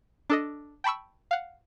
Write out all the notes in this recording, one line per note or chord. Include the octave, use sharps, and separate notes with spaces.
D4 A4 D#5
G5 A5 B5 C#6 E6
F5 F#5